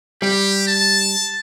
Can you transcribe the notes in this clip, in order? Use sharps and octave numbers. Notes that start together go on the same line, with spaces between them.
G3 G4
A5